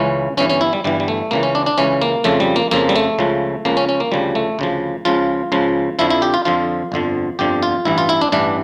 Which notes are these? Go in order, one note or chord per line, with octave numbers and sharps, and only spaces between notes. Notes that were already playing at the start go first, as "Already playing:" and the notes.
Already playing: C#2 C#3 E3 C#4
G1 G2 E3 C#4
C#4
E4
G3
G1 G2 E3 G3
G3
A3
C#2 C#3 E3 A#3
C#4
D4
D4
C#2 C#3 E3 C#4
A#3
F2 C#3 F3 A3
G3
A#3
F2 C#3 F3 A#3
G3
A3
C#2 C#3 F3
C#2 C#3 F3 A#3
C#4
C#4
A#3
D2 C#3 F3 G3
A3
D2 C#3 F3
C#2 C#3 F3 F4
C#2 C#3 F3
F2 D3 F3 E4
E4
G4
F4
F2 D3 F3 F4
G1 F2 D3 F3
G1 F2 D3 F3 G4
F4
A1 G2 E3 E4
F4
E4
D4
A1 G2 E3 D4